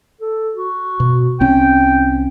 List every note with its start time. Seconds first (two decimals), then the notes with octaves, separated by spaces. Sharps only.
0.21 A4
0.54 F#4
1.00 B2
1.40 C2 C4 C#4 G5